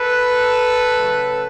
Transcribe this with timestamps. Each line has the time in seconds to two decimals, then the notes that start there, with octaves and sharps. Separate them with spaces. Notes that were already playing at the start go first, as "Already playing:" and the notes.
Already playing: A4 B4
0.96 C#3 F#3 A3